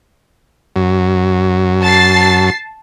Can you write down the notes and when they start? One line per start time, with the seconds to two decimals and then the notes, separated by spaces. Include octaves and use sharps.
0.76 F#2
1.82 A5 A6 C7